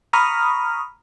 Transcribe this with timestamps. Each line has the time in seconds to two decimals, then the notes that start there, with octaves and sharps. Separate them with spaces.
0.13 A#5 B5 C#6 D#6 F6